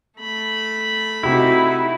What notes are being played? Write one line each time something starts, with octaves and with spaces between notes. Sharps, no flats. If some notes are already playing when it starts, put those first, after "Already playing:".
A3 B5
C3 D#4 E4 F#4 G4